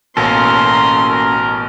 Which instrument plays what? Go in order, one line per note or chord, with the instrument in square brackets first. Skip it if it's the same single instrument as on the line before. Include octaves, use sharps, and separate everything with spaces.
[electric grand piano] A1 B2 [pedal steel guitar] A#3 C#4 A4 [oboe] A#4 [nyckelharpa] C6
[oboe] A#5
A#4